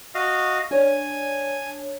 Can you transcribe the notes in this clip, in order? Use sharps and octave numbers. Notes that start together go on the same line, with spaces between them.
F#4 D#5 F5
D4 C#5 G#5